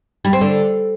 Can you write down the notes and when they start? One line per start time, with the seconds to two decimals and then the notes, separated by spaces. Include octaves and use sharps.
0.25 G3
0.33 C4
0.41 D3